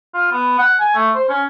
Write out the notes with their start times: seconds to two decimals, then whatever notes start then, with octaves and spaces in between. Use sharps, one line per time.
0.14 F4
0.32 B3
0.59 F#5
0.80 G#5
0.95 A3
1.15 C5
1.29 C#4